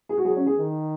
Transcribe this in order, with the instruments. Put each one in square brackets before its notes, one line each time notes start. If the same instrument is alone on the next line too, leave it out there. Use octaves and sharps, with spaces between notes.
[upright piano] G#4
F#4
[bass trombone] F#3 [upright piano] G#4
[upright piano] C#4
G#4
[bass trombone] D#3